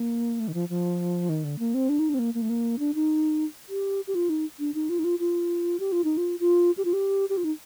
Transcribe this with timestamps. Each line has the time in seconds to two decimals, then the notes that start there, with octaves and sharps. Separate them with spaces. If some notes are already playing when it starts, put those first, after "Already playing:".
Already playing: A#3
0.40 A3
0.48 D#3
0.54 F3
0.69 F3
1.29 D#3
1.44 D3
1.59 A#3
1.74 C4
1.89 D4
1.99 D#4
2.09 D4
2.14 C4
2.19 A#3
2.34 A#3
2.42 A3
2.50 A#3
2.79 D4
2.95 D#4
3.69 G4
4.07 G4
4.15 F4
4.29 D#4
4.59 D4
4.74 D#4
4.89 F4
4.99 D#4
5.04 F4
5.19 F4
5.80 G4
5.92 F4
6.04 D#4
6.17 F4
6.40 F4
6.77 G4
6.85 F4
6.93 G4
7.30 G4
7.37 F4
7.44 D#4